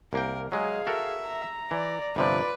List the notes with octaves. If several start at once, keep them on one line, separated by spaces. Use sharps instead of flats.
C2 A#3 A#4 G5
F#3 G#3 G#4 D#5 F5
F#4 A4 A#4 E5
A#5
E3 D5
G1 C3 F3 F4 B4 D5